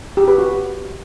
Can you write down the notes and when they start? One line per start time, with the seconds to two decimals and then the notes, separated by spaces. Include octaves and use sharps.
0.17 G4
0.28 B4
0.38 F#4